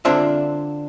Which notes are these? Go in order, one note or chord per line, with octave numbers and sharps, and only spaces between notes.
D3 C4 D4 F4 C5 E5